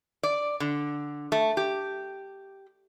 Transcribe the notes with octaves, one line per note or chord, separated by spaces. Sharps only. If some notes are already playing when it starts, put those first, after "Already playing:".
D5
D3
A3
G4